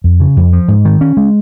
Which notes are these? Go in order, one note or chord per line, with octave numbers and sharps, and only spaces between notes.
F2
C#3
F2
F3
G#2
D#3
C#4
G#3